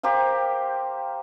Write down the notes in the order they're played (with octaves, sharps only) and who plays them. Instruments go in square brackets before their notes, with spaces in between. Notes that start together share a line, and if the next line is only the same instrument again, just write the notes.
[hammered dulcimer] G4 A#4 C5 F5